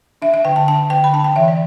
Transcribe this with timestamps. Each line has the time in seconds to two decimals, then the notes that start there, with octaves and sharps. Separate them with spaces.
0.22 D4 E5
0.34 E5
0.45 D3 G5
0.56 A5
0.68 D4 A5
0.90 D3 G5
1.04 B5
1.13 D4 A5
1.24 G5
1.36 E3 E5
1.48 D5